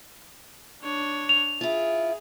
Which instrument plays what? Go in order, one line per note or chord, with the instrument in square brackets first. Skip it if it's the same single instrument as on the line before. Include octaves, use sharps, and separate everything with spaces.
[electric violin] D4 C#5
[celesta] F7
[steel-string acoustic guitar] E4 F4 [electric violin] G#4